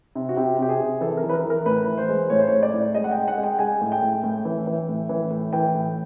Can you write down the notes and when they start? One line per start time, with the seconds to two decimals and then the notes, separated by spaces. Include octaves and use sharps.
0.15 C3
0.29 F#4
0.37 C3 G4
0.59 C3 G4
0.69 G#4
0.80 C3
1.01 E3 A4
1.17 A#4
1.24 E3
1.29 B4
1.34 A#4
1.45 E3
1.50 A#4
1.66 A2 B4
1.87 E3
1.98 C5
2.09 G#3
2.30 A2 C#5
2.39 C5
2.47 A2 C#5
2.63 D5
2.74 A2
2.94 G#3 D#5
3.04 F#5
3.11 G#3 G5
3.28 F#5
3.38 G#3
3.44 G5
3.59 G#3 G#5
3.81 A2
3.92 G5
4.02 A2
4.24 A2
4.45 E3
4.67 E3
4.89 A2
5.09 E3
5.31 A2
5.53 E3 G5
5.74 A2